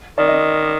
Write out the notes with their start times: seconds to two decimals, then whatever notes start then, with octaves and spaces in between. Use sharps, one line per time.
0.18 D#3 D5
0.28 D#5